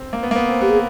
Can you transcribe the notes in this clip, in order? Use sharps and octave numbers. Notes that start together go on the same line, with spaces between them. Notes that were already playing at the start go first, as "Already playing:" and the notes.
Already playing: C4
A#3
B3
A#3
B3
C4
B3 G4
G#4